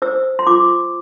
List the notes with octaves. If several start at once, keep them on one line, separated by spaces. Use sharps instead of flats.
C5 E6
C6
F4 D6